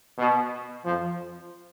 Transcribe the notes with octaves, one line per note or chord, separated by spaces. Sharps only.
B2
F2 F3